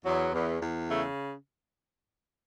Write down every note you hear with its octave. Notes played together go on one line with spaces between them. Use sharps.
E2 F#3
E2
E2
C#3 A3